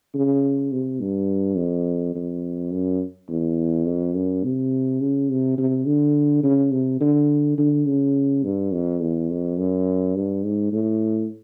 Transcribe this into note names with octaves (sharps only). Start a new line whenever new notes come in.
C#3
C3
G2
F2
F2
F#2
E2
F2
F#2
C3
C#3
C3
C3
D3
C#3
C3
D3
D3
C#3
G2
F2
E2
F2
F#2
G2
G#2
A2